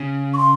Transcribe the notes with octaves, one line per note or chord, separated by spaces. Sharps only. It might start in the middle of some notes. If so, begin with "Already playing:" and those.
Already playing: C#3
C#6
C6